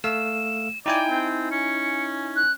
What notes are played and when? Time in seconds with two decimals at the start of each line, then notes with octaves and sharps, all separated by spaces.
0.04 A3 F5 E6 E7
0.86 D#4 E4 D5 G5 G#5
1.10 C4
1.52 C#4 C#7
2.36 F#6